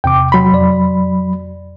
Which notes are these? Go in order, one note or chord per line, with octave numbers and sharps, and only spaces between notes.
E2 C3 G5 D6
F#3 B5 C6
F2 D5